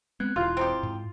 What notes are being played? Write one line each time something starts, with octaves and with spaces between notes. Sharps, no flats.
G#3 B3 C4 F#6 G#6
E1 E4 F4 C6
C4 D#4 G4
G#2